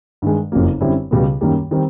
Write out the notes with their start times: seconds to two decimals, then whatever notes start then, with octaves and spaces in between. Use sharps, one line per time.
0.22 G2 D#3 G#3
0.52 F#1 F2 C#3 F#3 A#3
0.81 F#2 D3 G3 C4 E4
1.11 C#2 B2 G3 B3
1.41 F#2 D#3 G3 A#3
1.71 D#3 G3 C4